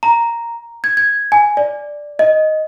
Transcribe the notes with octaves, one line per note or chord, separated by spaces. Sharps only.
A#5
G#6
G#6
G#5
D5
D#5